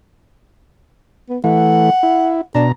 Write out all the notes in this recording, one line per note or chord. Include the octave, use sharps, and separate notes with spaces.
B3
E3 A3 F#5
E4
B2 D4 A#5